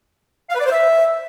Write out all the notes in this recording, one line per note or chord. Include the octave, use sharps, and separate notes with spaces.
F5
B4
D5
C5
E5